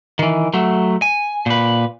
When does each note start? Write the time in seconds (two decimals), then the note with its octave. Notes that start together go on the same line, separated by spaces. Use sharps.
0.19 D#3 E3
0.54 F#3 A3
1.02 G#5
1.46 A#2 B4